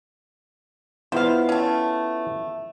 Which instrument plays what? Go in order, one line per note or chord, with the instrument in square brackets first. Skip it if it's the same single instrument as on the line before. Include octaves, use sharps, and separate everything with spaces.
[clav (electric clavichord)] B3 E4 F4 [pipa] C5 F5
[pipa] A3 C#4